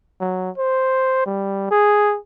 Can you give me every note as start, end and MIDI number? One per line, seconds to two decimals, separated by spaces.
0.21 0.50 54
0.58 1.22 72
1.26 1.67 55
1.71 2.18 68